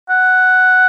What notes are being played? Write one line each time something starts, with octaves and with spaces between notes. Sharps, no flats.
F#5